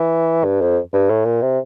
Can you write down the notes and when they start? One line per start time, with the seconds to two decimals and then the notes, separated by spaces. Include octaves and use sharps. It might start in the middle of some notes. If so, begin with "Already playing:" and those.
Already playing: E3
0.44 G2
0.61 F2
0.93 G2
1.10 A2
1.25 A#2
1.42 C3